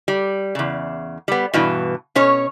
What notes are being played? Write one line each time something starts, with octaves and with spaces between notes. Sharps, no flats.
G3
E2 C#3
G3 B3
G2 B2 E3
B2 C#4 C#5